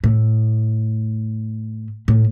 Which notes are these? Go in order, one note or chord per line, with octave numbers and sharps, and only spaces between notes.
A2
A2